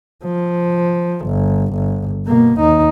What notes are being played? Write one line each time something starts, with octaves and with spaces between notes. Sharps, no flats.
F3
G1
G1
B2 A#3
D#2 D#4